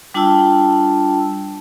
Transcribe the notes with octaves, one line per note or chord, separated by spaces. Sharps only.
G3 D4 F4 G5 A5 E6